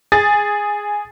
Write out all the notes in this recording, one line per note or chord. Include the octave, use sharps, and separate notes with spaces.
G#4 A6